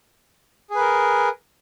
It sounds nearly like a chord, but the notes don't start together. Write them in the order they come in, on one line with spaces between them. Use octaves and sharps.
G#4 B4 A#4